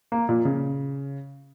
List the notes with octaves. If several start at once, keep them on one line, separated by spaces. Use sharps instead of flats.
A#3
A#2
C#3